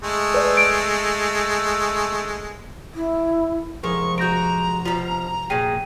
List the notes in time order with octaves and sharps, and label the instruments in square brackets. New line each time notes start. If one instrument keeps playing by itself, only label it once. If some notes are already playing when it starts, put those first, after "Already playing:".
[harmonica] G#3 A3
[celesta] B4 D5
D7
[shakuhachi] E4
[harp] F1 [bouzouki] G#3 A#4 [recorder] C#6
[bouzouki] G#3 F#4 [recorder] A#5 [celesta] G6 A#6 D7
[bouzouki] B2 F3 [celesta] F4
[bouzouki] A#2 F#3 [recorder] G#4 [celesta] G5 D#7